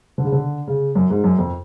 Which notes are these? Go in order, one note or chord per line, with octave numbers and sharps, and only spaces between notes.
D3
C#3
D3
C#3
F#2
G#2
F#2
F2